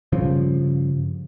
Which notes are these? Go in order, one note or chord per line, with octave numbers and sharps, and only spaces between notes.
G2 C#3 F3